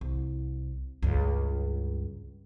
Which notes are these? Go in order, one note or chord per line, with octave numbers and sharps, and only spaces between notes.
C2
C#2 G2